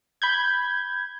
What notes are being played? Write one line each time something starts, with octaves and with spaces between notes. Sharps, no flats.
B5 G6 G#6